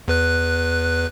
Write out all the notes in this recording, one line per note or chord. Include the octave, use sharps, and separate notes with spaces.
E2 B4 F#6